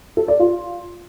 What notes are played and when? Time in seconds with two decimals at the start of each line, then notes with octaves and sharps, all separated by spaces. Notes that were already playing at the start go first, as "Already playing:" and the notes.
0.17 A4
0.28 D5
0.39 F4